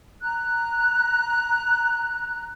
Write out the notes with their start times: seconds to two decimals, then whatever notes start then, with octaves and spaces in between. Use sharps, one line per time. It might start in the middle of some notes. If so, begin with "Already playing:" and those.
0.21 A#5 F#6